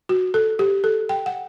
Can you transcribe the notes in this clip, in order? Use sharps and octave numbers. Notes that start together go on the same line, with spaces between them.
F#4
A4
G4
A4
G5
F#5